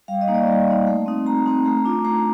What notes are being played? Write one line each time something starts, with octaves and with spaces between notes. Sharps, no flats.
G3 F5
D#5
A#3 D#4
D5
G3
A#3 D#4
A3
C4 D#4
A3 A#5
C4 D#4
A3 A#5
D4 F4
A3 A#5